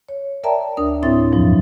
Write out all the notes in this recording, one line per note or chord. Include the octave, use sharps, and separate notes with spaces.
C#5
A#4 D5 E5 G5 A5 A#5
D2 D4 A#4 D#6
A2 C4 E4 C#5 E5 A6
E2 G2 B2 F3 F#3